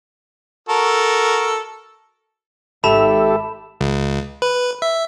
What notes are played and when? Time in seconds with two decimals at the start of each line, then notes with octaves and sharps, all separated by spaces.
0.69 F#4 A4 A#4
2.84 G#1 G4 A4 E5 A5 B5 E7
3.81 C#2
4.42 B4
4.82 E5